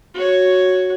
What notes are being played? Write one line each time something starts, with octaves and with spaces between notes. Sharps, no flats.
F#4 C#5